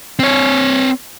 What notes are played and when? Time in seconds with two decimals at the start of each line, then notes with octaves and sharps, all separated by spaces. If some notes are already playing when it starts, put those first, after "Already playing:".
0.19 C4 C#5